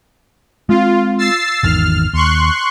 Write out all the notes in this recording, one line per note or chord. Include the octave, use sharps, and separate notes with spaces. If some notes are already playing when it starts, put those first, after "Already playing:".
G#3 B3 C4 F4
E6 A6 C7
G#1 E2 D#3 F6
D#2 C6 C#6 F#6